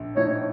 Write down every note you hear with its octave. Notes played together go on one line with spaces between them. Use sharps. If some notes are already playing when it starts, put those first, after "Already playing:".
Already playing: A#1
A2 F3 A3 D#4 C#5